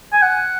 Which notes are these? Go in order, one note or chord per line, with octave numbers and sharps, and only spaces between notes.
G#5
F#5